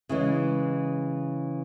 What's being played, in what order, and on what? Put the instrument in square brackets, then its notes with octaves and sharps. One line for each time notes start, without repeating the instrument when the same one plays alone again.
[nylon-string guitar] C#3 E3 G#3